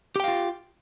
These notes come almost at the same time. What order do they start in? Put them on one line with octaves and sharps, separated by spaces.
G4 G5 F5 F4